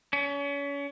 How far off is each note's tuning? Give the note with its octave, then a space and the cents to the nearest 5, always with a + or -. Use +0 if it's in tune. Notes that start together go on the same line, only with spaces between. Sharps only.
C#4 +35